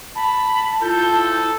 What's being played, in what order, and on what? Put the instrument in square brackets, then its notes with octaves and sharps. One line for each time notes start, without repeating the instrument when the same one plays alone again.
[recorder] A5 [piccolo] B5
[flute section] E4 F4 [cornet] A4 [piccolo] G6